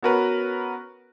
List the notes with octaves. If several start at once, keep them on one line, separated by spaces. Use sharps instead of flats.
B3 C#4 F#4 A#4 B4